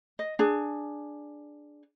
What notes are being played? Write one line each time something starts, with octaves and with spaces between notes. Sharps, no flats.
D#5
D4 G#4